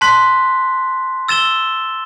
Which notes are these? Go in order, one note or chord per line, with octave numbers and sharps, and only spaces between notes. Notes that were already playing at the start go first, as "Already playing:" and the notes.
A5 C6 F#6 B6
E6 A6 E7 G7